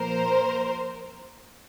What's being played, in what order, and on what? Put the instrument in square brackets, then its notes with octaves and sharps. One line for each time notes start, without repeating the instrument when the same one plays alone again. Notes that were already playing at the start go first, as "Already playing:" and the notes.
Already playing: [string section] A#2 F3 A#3 A#4 C5